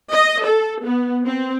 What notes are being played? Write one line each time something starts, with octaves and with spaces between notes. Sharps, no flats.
D#5
A4
B3
C4